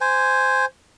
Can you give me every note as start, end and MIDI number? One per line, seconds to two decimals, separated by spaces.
0.01 0.65 72
0.01 0.65 80